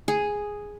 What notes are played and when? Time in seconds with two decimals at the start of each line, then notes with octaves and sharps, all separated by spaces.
0.08 G#4